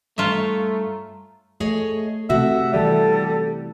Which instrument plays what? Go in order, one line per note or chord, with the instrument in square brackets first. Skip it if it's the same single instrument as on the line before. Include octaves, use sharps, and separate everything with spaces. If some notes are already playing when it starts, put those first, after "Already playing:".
[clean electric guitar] G2 C#5 [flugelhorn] A3 [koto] F4 E5 [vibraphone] A#5
[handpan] A3 [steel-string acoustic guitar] G#4 C#5 D#5
[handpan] C3 A3 A4 [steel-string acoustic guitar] F#4 [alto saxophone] E5
[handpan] E3 D5 [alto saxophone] G3 [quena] A4